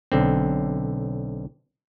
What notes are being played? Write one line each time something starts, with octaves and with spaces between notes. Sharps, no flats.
B1 D3 C4